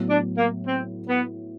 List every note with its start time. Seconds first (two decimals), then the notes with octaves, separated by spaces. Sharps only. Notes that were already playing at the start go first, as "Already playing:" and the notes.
Already playing: A2 F#3 B3
0.10 D4
0.38 A#3
0.67 C4
1.09 B3